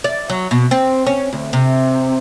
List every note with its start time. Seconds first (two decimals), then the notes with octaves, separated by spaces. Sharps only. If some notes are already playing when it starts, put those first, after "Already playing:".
0.04 D5
0.30 F#3
0.51 B2
0.71 C4
1.07 C#4
1.33 D2
1.53 C3